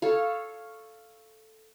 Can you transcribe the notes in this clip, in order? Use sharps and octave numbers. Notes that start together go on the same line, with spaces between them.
A4 C#5 F5